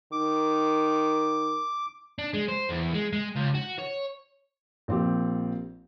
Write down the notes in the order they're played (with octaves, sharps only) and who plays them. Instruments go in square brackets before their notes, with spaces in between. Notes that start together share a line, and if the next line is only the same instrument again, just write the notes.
[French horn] D#3 [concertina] D6
[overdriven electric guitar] D4
G#3
C5
E2
G#3
G#3
C#2
F#4
C#5
[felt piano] A#1 C4 G4